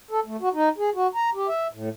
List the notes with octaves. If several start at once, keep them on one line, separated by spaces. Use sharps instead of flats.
A4
A3
F#4
D#4
G#4
F#4
A#5
G4
E5
A2